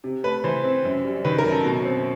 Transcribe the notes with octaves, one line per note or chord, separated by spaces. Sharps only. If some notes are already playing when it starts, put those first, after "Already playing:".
C3
A3 B4
E3 C5
C4
F#2
G3
D#3 B4
A#4
F#2
A4
B2
C4